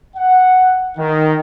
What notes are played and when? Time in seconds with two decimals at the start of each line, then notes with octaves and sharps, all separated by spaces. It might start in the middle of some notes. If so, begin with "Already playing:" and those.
0.16 F#5
0.98 D#3